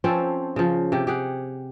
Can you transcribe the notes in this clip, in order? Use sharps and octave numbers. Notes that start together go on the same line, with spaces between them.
F3 C4 C#4 A4
C#3 F3
C3 G4
G4 G#4 F#5